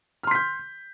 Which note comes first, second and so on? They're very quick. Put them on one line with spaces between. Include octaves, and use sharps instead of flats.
F6 C6 B6 G6